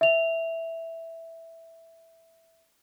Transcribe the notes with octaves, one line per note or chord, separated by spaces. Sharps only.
E5 F7